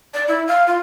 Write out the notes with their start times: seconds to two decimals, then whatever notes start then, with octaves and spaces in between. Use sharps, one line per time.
0.14 D5
0.28 E4
0.48 F5
0.67 F4